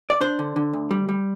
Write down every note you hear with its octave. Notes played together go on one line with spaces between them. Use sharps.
D5
D4 C5
D3
D3
D2
G3
G3